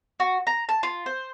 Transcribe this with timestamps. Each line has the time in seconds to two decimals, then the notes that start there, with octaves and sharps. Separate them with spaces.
0.20 F#4
0.47 A#5
0.69 A5
0.83 F4
1.06 C5